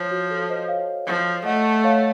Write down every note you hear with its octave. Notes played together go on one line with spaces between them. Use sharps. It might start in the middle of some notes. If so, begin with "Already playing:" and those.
Already playing: F3 C#5
F#4
A4
C5 D#5
C#5 F5
F3
A3 D#5 F#5
C#5 F5